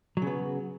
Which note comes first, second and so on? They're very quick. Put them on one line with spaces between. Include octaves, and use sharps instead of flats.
F#3 C#3 B3